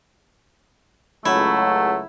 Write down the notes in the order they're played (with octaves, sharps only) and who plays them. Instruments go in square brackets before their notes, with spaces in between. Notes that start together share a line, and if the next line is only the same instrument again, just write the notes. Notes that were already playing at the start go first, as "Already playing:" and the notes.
[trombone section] C#2 F#3 [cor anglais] A3 [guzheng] E4